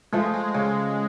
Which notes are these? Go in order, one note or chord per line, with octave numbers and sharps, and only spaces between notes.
F3 G#3 A3
G#3
C#3 G#3